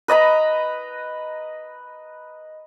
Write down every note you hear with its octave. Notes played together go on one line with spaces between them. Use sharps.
B4 D#5 A#5 B5